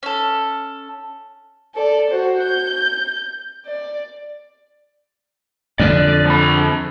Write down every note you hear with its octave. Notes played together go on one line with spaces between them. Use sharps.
C#4 A4
A4 D5
F#4 C5
G6
D5
F2 D3 D5
F3 B5